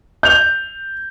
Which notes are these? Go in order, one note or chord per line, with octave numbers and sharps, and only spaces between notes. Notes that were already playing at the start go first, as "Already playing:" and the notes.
G6 F7